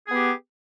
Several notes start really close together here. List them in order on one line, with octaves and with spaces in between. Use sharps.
G#4 B3 G4